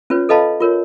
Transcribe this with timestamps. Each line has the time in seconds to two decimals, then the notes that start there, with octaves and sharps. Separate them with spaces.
0.10 C#4 F4 B4 C#5
0.29 A4 B4 D#5 F5 A5 B5
0.60 F4 A#4 C#5